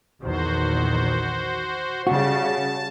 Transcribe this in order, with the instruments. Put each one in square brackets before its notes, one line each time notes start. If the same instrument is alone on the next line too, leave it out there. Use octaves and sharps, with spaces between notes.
[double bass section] A#1 E2 D#3 [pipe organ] F#4 C5
[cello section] C#3 [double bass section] G3 C#4 [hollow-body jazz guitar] F#4 [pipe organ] A5